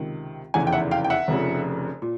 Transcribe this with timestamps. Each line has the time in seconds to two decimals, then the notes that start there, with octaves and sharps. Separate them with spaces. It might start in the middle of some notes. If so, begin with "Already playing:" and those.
Already playing: C#2 C3 D#3
0.54 F1 E2 C#3 E3 F#5 G#5
0.67 G5
0.73 E5 F#5
0.91 F5 G5
1.04 G5
1.10 E5 F#5
1.28 F1 F2 C#3
2.02 A#2